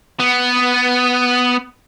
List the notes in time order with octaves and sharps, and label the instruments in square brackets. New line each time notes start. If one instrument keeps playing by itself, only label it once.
[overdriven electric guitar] B3